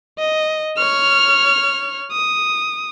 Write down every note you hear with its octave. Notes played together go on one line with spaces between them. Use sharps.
D#5
C#5 F6
D#6